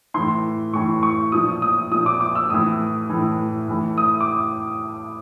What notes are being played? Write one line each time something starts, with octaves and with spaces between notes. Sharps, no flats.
A2 E3 C6
A2 E3 C#6
C#6
A#2 F3 D#6
D#6
A#2 F3 D#6
D6
D6
E6
A2 E3 D#6
A2 E3
A2 E3
D#6
D6